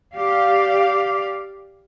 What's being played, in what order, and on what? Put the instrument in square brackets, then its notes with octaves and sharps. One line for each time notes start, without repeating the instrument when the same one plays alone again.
[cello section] G4 D5 F5